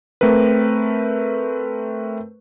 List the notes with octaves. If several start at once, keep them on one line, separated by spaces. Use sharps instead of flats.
A3 C4 A#4 B4